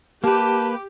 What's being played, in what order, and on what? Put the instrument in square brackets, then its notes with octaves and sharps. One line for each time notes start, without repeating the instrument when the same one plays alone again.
[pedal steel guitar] A#3 B4 [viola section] G4 [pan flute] A5